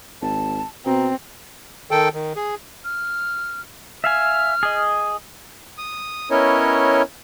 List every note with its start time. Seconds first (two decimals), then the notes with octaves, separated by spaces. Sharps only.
0.22 G#1 A5
0.86 B2 C4 A#5
1.91 D#3 A4 G5
2.14 D#3
2.36 G#4
2.84 F6
4.04 E5 F5 G#5 F6
4.63 G#4 D#5
5.78 D#6
6.31 B3 C#4 E4 A#4 C#5 D#5